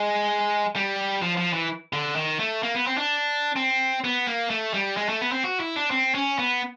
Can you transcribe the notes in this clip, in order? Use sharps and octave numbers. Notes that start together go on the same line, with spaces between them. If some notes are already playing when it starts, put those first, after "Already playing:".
Already playing: G#3
G3
F3
F3
E3
D3
D#3
A3
A#3
B3
C4
D4
C4
B3
A#3
A3
G3
G#3
A3
B3
C4
F#4
E4
D4
C4
C#4
B3